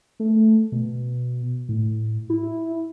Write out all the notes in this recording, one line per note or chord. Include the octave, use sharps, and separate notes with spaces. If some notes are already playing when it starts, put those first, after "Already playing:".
A3
B2
A2
E4